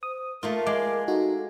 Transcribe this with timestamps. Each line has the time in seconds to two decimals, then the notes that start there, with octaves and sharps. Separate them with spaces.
0.03 C5 D#6
0.43 A3 A#3 F4 A#4
0.67 G#3 D6
1.08 D#4 F#4 A4